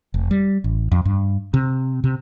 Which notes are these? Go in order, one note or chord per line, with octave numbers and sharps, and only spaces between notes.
F1
G3
A1
F2
G2
C3
C3